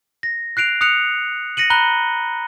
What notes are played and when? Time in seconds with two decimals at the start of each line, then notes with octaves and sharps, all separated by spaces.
0.23 A#6
0.57 F#6 C7 D7 F7
0.81 D#6 F#6 C#7 F7
1.57 A#6 C#7 D#7 F#7
1.70 A#5 B5 F#6 G7